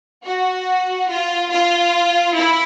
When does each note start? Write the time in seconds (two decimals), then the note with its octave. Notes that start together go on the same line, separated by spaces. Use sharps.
0.25 F#4
1.09 F4
1.51 F4
2.35 E4